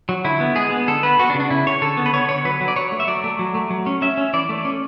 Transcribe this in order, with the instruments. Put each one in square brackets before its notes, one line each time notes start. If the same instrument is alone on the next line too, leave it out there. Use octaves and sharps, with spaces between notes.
[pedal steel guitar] F#3
D3 E4
B3
G#3 G#4
B3
D3 A4
B3 B4
B3 F#4
D4
C#3
D4
C#3 E4
C#3 C#5
D3 A4
B3
B4
B3 C#5
D3 C#5
F#3 B4
F#3
D5
F#3 C#5
A3
E5
F#3 D5
A3
F#3
A3
F#3
C#4
C#4 E5
C#4
E3 D5
A3
C#4